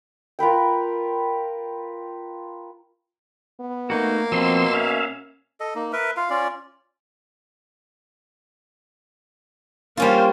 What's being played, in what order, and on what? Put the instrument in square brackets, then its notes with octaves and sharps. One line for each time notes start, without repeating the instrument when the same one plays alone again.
[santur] F4 A#4 B4 G5
[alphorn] B3
[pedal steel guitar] A3 D#4 F#4 [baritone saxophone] A#3
[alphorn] B2 [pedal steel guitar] F3 C4 [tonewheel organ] C6 E6
[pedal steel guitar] C#4 [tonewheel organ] E5 F5
[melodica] A4 D#5
A#3 D#4
A#4 B4 E5
F4 F5
C#4 F4 D5
[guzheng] G3 C#4 F4 [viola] A#3 C5